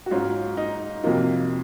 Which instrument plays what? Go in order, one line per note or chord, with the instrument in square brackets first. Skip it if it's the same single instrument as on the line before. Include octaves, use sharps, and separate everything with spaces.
[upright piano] F#4
G#2 F#3 C#4 F4
D#4
F2 C3 F#3 A#3 D#4 F4